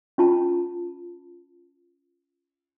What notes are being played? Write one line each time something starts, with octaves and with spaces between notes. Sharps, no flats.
C#4 F4 A5